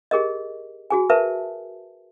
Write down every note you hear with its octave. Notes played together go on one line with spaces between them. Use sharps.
G4 G#4 A#4 D#5
F#4 G#4 G#5
A#4 B4 E5 A5